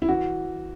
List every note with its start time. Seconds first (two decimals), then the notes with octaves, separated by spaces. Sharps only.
0.02 E4
0.08 E3 F#4